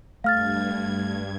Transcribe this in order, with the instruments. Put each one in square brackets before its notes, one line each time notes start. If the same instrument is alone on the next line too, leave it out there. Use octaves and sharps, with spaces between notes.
[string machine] G2 G#6 [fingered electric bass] A3 [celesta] F5 F6 A6